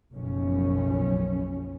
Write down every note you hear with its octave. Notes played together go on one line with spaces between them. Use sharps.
F#1 B1 F#2 F3 C#4